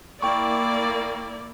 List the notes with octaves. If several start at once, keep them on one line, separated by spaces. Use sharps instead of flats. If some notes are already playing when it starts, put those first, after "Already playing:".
A#3 E4 D5 G5 C#6